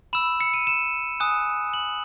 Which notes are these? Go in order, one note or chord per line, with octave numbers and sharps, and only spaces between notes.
B5 E6 E7
C#7
D#7
E7
G#5 D#6 F#6
F#7